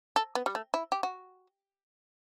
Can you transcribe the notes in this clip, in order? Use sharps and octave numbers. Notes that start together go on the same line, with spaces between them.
A4
B3
G3
A3
E4
G4
F#4